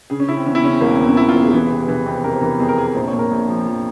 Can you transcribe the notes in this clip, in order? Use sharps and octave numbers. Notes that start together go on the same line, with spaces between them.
C#3 G#4
C#4
C#3 E4
C4
E2 C#4
E4
C#3 C#4
C4
E1 A#3
C4
E2
C#4
E2 E4
F4
E1
G#4
G4
E3 G#4
C3
E3
F2
C3 A#4
C5
E3 A#4
F2 G#4
A#4
F2 G#4
A#4
A#1 C5
C#5
A#2
A#4
A#1
F3
F3